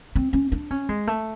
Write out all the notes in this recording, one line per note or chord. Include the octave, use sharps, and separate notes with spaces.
C4
C#4
D4
C#4
G#3
A3